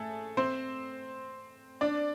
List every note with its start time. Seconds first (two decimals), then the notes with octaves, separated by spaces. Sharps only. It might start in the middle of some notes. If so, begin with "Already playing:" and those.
Already playing: A3 G#4 A4
0.37 C4 C5
1.81 D4 D5